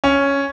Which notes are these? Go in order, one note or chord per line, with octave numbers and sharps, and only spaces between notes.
C#4